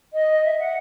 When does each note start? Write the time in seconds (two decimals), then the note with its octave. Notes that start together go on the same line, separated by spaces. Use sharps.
0.12 D#5
0.43 E5
0.58 F#5